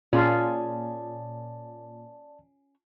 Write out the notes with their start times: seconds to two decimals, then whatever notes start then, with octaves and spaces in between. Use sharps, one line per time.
0.13 A#2 C#4 F4 G#4 D5 A5